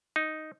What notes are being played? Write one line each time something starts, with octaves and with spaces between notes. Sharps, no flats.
D#4